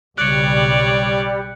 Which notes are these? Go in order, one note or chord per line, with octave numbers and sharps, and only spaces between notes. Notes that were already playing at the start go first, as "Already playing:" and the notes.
B1 C#3 G3 C#5 D5 F#6 C#7